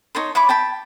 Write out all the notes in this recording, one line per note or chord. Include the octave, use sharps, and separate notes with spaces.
D#4 C#5 A5 C6
E4 C#5 B5 D6
G5 A5 B5